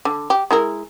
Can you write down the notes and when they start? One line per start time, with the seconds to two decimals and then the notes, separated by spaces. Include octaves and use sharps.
0.05 D3
0.30 G4
0.51 G#3 E4 A#4